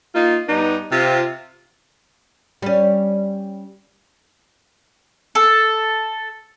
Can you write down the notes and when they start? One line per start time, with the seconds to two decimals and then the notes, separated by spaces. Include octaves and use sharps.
0.15 A#3 D#4 F4
0.48 G2 B3 D4 D#4
0.92 C3 F4
2.62 G3 C#4
5.35 A4